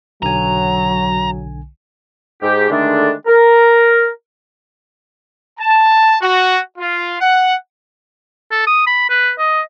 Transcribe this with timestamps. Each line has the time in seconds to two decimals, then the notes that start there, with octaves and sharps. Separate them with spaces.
0.23 B1 D3 F#3 G#5 A#5
2.42 G#2 G4
2.70 D3 D#3 G#3 A3 D4
3.27 A#4
5.59 A5
6.22 F#4
6.78 F4
7.20 F#5
8.51 A4
8.67 D#6
8.87 B5
9.10 B4
9.39 D#5